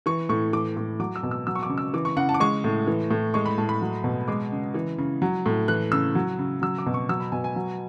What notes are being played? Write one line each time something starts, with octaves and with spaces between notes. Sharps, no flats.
E3 C#6
A2 C#6
E3 D6
A2
F#3 D6
E6
B2
E6
F#3 E6
C#6
D6
C#3
E6
E3 D6
C#6
C#3 F#5
A5
D6
G#3 C#6
A2
E3
A2
G#3 C#6
B5
A2 A5
B5
F#3
B2
G#3 D6
C#3
E3
C#3
F#3
A2
E3 F#6
C#3 E6
F#3
C#3
F#3 E6
D6
B2
C#6
F#3 E6
B5
B2 G#5
G#5
F#3